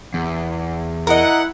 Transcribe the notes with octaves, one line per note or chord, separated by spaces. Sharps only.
E2
E4 A#4 D#5 F#5